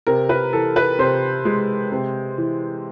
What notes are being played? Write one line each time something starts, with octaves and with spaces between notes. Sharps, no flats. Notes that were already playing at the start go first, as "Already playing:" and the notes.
C3 A#4
B4
E3 A4
B4
C3 C5
G#3
C3
E3